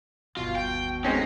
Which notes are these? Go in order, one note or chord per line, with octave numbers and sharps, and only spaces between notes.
G1 D#2 B2 F4
G5
G#3 C4 C#4 D#4